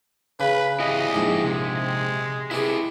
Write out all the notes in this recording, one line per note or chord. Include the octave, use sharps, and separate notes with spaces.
C#3 B4
E4 G4 G#4 D#5
A#1 G#2
C3 G#3
B3 E4 G4 G#4